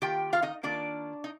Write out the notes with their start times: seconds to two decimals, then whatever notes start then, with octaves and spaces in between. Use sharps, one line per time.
0.02 D#3 A#3 F4 G4 G5
0.33 F4 F5
0.42 D#4 D#5
0.63 D#3 A#3 D4 F4 D5
1.24 D#4